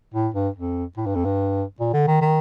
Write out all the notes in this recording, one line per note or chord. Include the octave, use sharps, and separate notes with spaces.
A2
G2
F2
A2
G2
F2
G2
A#2
D3
D#3
D#3